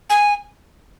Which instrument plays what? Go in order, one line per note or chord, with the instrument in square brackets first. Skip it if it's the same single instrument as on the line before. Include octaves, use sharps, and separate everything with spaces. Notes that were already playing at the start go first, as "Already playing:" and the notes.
[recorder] G#5